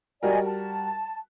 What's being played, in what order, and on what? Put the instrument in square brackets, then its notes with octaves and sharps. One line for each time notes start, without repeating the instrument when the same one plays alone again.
[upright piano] G3 F#4 A#4 [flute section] D5 D#5 G#5
[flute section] A5